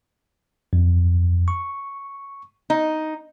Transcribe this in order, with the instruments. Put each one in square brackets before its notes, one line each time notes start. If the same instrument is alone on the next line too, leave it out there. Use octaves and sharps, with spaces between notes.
[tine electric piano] F2
C#6
[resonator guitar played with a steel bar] D#4